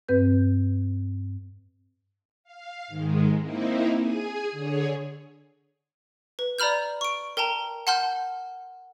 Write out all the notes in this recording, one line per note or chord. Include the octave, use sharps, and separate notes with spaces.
G2 C4 B4 G6
F5
G#2 D#3 G#3
A#3 C4 D#4 E4
G#4 G#5
D3 G#4 C#5
B4
D5 A#5 B5 F6 G6
C#6 D7
A#4 G5 A5 A#5
F#5 A5 C6 F6 G6